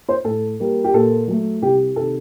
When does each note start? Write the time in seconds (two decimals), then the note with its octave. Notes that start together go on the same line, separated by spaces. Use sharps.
0.09 C5
0.24 A2 A4
0.60 G3 A#3
0.84 G4
0.94 A#2 A4
1.28 F#3 A3
1.62 C2 G4
1.96 C3 D#3 A4